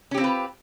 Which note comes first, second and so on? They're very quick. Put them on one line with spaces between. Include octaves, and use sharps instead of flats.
C#4 G4 C4 F4 B4